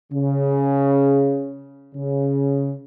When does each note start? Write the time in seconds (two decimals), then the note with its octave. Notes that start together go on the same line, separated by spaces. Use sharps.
0.12 C#3
1.95 C#3